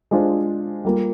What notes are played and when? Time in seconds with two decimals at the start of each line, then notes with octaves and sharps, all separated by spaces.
0.11 G#3 D4 F4 G#4 C5
0.85 G3 A#3 F4